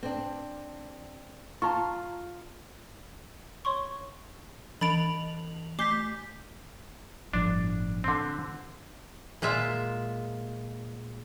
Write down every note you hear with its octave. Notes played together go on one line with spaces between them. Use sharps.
C4 D4
F4 A5 A#5 C#6
C#5 C6 C#6
E3 B5 A6 D7 F7 F#7
A3 D6 G6 B6 C7 G7
G1 A2 F3 D4
D3 C4
A#2 G#3 F4 E5